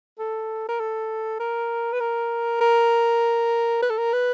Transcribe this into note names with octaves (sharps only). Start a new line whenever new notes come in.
A4
A#4
A4
A#4
B4
A#4
A#4
B4
A4
A#4
B4